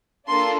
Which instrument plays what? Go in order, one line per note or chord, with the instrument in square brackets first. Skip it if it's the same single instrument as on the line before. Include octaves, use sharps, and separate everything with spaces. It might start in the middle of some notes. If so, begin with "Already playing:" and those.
[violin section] A#3 D4 F4 A4 C6